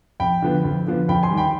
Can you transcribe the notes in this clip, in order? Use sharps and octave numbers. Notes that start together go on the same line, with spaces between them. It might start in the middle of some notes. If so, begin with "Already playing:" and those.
F2 G5 B5
D3 F3 B3
F2
D3 F3 B3
F2 G5 B5
G#5 C6
D#3 G3
G5 B5